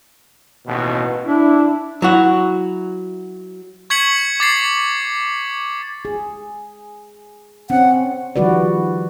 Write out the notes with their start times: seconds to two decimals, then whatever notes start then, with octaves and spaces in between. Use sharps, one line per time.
0.66 A1 D#2 B2
1.26 D4 E4
2.02 F#3 E4 F#4
3.90 C#6 G#6 B6 C#7 F#7
4.40 D6 A6 C7
6.05 G#4
7.70 C4 C#4 F#5
8.36 D#3 F3 G3 F#4 B4 D5